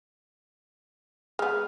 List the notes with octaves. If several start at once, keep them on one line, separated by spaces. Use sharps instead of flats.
G#3 B3 G#4 F6